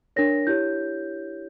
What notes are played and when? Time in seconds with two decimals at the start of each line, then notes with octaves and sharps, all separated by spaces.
0.16 D4 A#4 C#5 A#6
0.47 E4 G4 C#5 G6